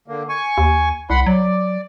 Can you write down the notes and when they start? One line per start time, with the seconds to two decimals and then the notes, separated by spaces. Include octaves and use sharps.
0.08 D3 A#3
0.29 G#5 C#6
0.58 D#2
1.10 C2 F#5 B5 C6
1.26 F#3 D5